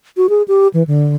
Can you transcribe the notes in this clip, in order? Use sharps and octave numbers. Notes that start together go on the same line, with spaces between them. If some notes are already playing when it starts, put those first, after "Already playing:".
F#4
G#4
G4
E3
D3